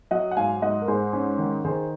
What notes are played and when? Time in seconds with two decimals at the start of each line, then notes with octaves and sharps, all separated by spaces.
0.11 F#3 D#5 F#5
0.31 F#5
0.37 G#2 F5 G#5
0.62 G#2 D#5 F#5
0.82 A#4
0.88 G#2 G#4 C5
1.13 C#4
1.38 D#3
1.65 D#3 G#4 C5